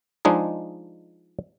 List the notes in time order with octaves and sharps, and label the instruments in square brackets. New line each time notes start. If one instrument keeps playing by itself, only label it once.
[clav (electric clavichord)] F3 G#3 D4 D#4 G#4